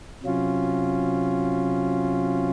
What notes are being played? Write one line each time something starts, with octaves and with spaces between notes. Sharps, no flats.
C3 F#3 C#4 F4